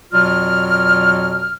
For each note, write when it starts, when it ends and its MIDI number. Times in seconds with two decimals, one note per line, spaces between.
0.13 1.53 41
0.13 1.53 47
0.13 1.53 54
0.13 1.53 65
0.13 1.53 74
0.13 1.53 89